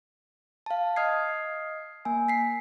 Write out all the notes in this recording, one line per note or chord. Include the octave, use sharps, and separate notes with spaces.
F5 A5
D#5 D#6 F6 G#6 C7
A#3 G#5
B6 C7